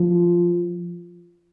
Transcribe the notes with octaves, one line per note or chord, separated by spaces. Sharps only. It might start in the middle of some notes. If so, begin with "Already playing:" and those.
Already playing: F3